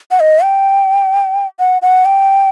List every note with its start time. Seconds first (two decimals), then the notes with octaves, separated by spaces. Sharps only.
0.11 F#5
0.20 D#5
0.43 G5
1.59 F#5
1.82 F#5
2.05 G5